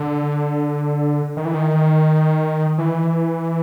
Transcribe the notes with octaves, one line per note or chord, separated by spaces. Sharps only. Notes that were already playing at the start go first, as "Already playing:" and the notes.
Already playing: D3
D#3
E3
D#3
E3